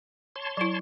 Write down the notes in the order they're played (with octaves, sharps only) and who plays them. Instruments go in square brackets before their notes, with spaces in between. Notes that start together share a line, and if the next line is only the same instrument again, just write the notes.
[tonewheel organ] C#5 A5 C6
[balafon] F#3 E4